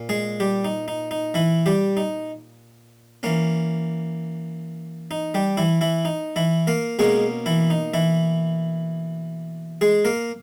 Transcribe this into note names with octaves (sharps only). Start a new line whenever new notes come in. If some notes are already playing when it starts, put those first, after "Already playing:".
Already playing: A#2
G#3 G#4
G3 G4
D#4
D#4
D#4
E3 E4
G3 G4
D#4
E3 A#3 C#4
D#4
G3 G4
E3 E4
E3 E4
D#4
E3 E4
A#3 A#4
B2 G#3 A#3 C#4 G#4
E3 E4
D#4
E3 E4
G#3 G#4
A#3 A#4